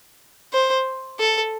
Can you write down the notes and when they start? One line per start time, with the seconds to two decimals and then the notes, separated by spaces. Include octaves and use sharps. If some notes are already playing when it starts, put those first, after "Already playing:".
0.53 C5
1.19 A4